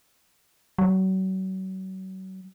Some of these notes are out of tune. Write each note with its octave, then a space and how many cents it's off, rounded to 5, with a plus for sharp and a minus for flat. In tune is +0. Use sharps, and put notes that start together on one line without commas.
F#3 +35